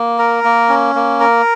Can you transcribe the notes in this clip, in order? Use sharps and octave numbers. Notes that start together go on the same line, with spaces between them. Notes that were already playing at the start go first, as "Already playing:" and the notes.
Already playing: A#3
A#4
A#3
C#4
A#3
A#4